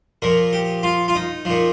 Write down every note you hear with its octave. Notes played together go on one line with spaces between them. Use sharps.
A#2 F3 A#4
G4
F4
F4
D#4
A#2 F3